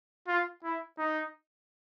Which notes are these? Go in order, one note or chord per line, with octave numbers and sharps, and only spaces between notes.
F4
E4
D#4